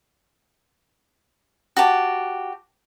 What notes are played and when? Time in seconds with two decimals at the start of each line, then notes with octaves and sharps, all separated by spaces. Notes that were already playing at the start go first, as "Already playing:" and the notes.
1.77 F#4 G4 A5